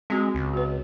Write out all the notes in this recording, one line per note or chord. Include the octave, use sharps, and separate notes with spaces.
G#3 C4 F#4
C#2
F#4 B4